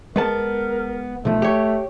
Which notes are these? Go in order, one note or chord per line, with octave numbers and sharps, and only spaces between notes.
G#3 B3 A#4 A5
B1 F3 A3
G4 C#5